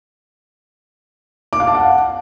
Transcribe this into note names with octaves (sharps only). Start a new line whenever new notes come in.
D6
F5
A5
F#5